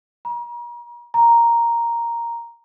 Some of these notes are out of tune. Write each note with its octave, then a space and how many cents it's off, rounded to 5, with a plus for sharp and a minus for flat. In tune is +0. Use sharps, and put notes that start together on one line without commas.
A#5 +40
A#5 +0